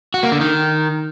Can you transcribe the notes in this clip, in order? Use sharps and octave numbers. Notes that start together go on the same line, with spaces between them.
F#4
A#3
D3
D#3